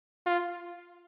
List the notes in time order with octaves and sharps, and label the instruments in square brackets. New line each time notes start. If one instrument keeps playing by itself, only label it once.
[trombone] F4